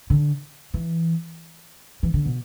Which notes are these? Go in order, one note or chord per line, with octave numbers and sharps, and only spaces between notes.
D3
E3
E3
D3
B2